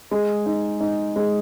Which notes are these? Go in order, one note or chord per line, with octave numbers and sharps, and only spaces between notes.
G#3
D#4
D#4
G#3